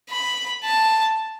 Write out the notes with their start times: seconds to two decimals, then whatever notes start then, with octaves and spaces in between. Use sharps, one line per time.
0.11 B5
0.65 A5